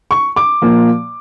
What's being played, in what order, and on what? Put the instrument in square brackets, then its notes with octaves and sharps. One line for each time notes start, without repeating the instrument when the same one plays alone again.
[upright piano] C#6
D6
A#2 F3 A#3